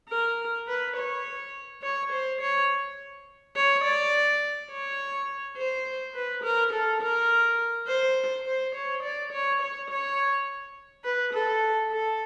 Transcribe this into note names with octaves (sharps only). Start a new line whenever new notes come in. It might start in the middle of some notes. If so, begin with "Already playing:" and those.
A#4
B4
C#5
C#5
C5
C#5
C#5
D5
C#5
C5
B4
A#4
A4
A#4
C5
C5
C#5
D5
C#5
C#5
C#5
B4
A4
A4